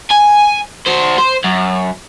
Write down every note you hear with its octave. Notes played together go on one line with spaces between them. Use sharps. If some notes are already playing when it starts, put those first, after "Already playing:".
G#5
F#4 C5
C5
F#2